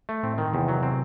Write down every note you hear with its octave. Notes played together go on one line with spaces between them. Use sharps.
A3
A2 C4
D#3
A2
E2 C3
F#3
C4